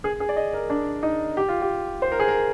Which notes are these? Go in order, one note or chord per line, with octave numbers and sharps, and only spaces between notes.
G#4
G#4
D5
D#5
A#4
D4
D#4
G4
F4
G4
C5
A#4
G#4
A#4